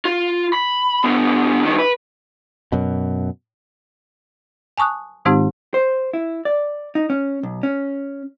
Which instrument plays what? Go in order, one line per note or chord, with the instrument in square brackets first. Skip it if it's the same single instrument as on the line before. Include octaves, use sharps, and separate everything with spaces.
[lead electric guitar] F4
B5
D3 B3
G2 D#3
B4
[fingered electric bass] F#2 B2
[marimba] G#5 A5 C#6 D#6 F#6
G#2 D#3 G#3 C4 D#4 G4
[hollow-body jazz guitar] C5
E4
D5
D#4
C#4
B1
C#4